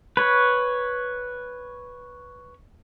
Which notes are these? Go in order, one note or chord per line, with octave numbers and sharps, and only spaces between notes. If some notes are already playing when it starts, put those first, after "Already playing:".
B4 C#5